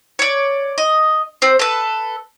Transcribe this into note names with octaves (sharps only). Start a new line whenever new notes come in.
C#5 D5
D#5
C4 C5
A4 B4